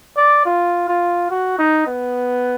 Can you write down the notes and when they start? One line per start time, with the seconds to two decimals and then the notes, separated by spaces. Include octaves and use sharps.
0.17 D5
0.45 F4
0.88 F4
1.31 F#4
1.58 D#4
1.87 B3